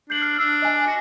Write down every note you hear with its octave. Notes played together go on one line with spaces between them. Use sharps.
D4 G6 C7 F#7
F6
D4 E6
D#5 G#5
F#4